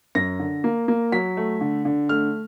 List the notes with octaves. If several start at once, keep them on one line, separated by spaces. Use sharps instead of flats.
F#2 A#6
D3
A#3
A#3
F#3 B6
A3
D3
D3
A3 F6